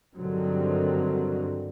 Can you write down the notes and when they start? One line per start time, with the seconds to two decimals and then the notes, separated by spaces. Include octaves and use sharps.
0.16 G2 D3 D#3 F#3 C4